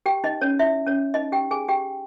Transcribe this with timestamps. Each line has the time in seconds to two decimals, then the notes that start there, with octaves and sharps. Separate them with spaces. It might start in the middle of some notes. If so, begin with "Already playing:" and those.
0.06 G4 G5
0.24 D#4 D#5
0.41 C#4 C#5
0.59 E4 E5
0.87 C#4 C#5
1.14 D#4 D#5
1.32 G4 G5
1.51 G#4 G#5
1.68 G4 G5